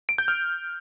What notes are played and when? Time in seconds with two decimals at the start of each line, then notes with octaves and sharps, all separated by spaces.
0.09 D7
0.18 G6
0.28 F6